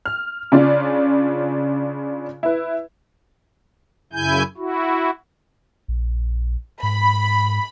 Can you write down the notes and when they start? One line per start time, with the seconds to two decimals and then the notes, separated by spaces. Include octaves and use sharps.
0.05 F6
0.52 C#3 C#4 D4 F4 D5
2.43 E4 B4
4.13 F#2 C#3 E4 G#5 G6
4.57 E4 F#4
5.88 A#1
6.83 G#2 B5